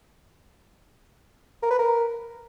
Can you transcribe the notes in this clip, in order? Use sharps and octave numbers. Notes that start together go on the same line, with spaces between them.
A#4
B4
A#4